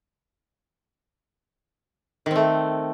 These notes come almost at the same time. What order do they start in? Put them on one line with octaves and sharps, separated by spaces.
D#3 C4 A3